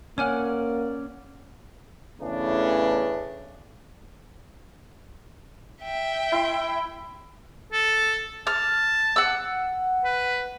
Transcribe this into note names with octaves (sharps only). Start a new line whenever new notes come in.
A#3 C#4 C#5 D5 F#5 G#5 F6
E2 A2 C#3 E3 D4
E5 G5
E4 C6
A4
A5 F6
F#5 E6
B4